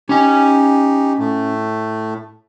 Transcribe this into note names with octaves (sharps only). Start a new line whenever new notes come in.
C#4 D#4 G4 G#5
A2 A3